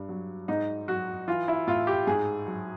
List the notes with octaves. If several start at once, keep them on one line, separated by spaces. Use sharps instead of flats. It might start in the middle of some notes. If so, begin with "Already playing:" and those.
Already playing: G2
F#3
G#2 D#4
F#3 F#4
E3 F4
E4
A2 F4
G4
G#2 G#4
F#3